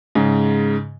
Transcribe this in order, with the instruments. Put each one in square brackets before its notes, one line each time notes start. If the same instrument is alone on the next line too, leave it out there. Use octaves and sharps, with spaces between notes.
[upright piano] G#2 C#3